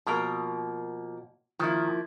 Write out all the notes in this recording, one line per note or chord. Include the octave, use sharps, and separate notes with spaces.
B2 F3 A#3 A#4
D#3 F3 A#3 E4